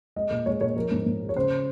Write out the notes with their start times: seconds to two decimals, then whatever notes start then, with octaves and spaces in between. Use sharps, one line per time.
0.16 G#3 D#5
0.30 A#2
0.46 G#3 C#5
0.61 A#2 C#5
0.75 F3 A#4
0.92 G#2
1.06 G#2
1.21 G#3
1.29 C#5
1.36 C#3 C5